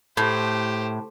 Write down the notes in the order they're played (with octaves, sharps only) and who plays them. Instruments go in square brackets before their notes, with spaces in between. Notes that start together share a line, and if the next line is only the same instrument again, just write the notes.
[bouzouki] A2 [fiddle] G4 C5